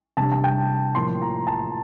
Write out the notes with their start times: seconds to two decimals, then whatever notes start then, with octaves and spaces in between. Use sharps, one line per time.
0.17 C3 G3 D4 A5
0.32 A5
0.44 G5
0.95 A2 F3 A#3 C6
1.22 A#5
1.47 A5